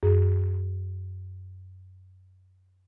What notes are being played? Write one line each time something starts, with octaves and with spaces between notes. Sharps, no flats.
F#2 G#4